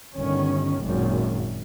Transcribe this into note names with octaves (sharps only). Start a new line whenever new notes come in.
G1 D#3 C#4
G#1 F#2 A#2